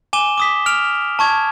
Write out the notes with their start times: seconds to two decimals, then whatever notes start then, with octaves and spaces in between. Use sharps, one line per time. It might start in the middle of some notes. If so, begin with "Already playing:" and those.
0.13 G#5 D6 E7 G7
0.38 D6 D#6 B6
0.66 F6 D7 F7
1.19 A5 C#6 G#6